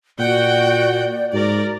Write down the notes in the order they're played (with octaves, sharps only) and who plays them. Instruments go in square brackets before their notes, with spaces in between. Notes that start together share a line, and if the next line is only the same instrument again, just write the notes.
[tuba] A#2 [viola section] F#4 F#5 G5 [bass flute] D5
[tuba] G#2 [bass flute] F#4 [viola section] A#4 D5